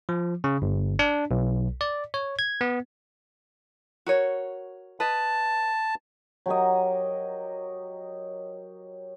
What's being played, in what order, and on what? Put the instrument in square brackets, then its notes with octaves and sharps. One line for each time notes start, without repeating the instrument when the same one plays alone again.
[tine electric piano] F3
C#3
G1
D4
B1
D5
C#5
G#6
B3
[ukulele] F#4 A#4 C#5
[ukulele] B4 D#5 [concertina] A5
[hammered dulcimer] F#3 G4 A#4 D#5